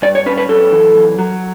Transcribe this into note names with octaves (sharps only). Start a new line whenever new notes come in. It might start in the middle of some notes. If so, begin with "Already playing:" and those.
G2 D5
C#5
C#4 B4
B4
F#2 A4
E3
F#2
F#3